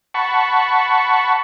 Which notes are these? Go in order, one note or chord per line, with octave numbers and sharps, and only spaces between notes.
F#5 A5 B5 C#6